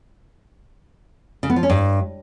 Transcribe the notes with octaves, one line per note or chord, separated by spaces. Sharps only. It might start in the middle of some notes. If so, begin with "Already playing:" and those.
C#3
B3
F3
C#4
G2